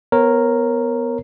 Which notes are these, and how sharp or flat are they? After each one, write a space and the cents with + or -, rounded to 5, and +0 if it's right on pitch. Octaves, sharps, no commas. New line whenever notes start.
B3 +0 A#4 +0 C#5 -25